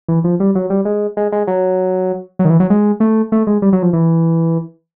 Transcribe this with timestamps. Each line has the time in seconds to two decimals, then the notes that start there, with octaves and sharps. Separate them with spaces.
0.08 E3
0.24 F3
0.40 G3
0.55 F#3
0.70 G3
0.85 G#3
1.17 G#3
1.32 G#3
1.47 F#3
2.39 F#3
2.45 D#3
2.50 E3
2.60 F#3
2.70 G#3
3.00 A3
3.32 A3
3.47 G#3
3.62 G3
3.73 F#3
3.83 F3
3.93 E3